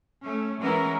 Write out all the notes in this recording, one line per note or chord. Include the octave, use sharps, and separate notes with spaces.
A3 C#4
E3 G#3 B3 C#4 E4 A#4